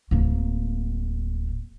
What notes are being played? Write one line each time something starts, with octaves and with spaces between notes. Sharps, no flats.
D1 A#3